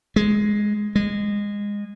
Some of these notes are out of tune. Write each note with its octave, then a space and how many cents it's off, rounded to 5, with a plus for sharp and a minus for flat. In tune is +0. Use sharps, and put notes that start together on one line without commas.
G#3 +5
G#3 -20